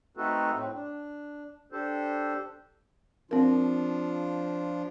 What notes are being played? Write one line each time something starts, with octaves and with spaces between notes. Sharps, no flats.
A3 C4 D#4 F#4 A4 B4
A2 C4
D4
D4 G4 A4 C5
F3 C4 D4 F4 A#4